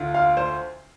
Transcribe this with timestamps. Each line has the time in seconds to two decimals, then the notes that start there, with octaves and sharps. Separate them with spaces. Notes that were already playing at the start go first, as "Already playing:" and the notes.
Already playing: D2 D3 F4
0.14 F5
0.37 C5